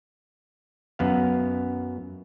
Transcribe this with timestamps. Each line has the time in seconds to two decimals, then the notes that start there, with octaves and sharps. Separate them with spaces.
0.99 F#2 B3 F5